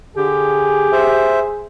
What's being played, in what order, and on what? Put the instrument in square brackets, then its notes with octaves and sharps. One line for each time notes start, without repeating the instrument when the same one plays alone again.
[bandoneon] D3 [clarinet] G4 [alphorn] G#4
[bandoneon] C5 E5